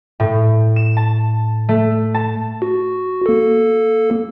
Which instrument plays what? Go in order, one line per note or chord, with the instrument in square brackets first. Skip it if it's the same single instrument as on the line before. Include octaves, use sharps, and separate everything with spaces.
[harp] A2
E7
A5
A3
A5
[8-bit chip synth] F#4
A#3 A4